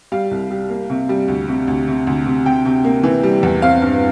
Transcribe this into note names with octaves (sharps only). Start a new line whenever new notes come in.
G3 F5
C2
G3
A#3
C3
G3
D2
C3
D2
C3
D2
C3
C3 G5
C3
A#3
E3
G3
E2
C4 F5
G2